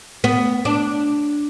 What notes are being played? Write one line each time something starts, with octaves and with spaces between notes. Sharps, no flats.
B3
D4